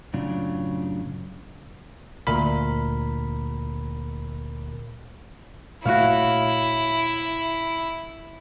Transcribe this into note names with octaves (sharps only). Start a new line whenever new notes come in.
F#2 A2 C#3 F#3 D4 F4
D2 A#2 A#4 B5
A#2 A3 E4 F#4 C#5 F5